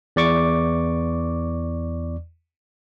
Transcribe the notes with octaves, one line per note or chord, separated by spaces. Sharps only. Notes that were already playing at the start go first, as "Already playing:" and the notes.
E2 D5 C#6 D6